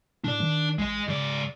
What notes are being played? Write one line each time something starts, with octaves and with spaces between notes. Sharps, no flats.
A2 D4 D5
D#3
A1 G#3 D#5
G#2 C#3 D5